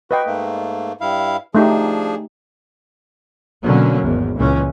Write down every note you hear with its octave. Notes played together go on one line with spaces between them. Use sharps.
F#4 B4 D#5 G5
G#2 A3 A#3
G2 E4 F5
F3 A3 D4 D#4 G4 G#4
B2 D3 F#3 A#3 C#4
G#1 E2
C#2 A#2 E3 C#4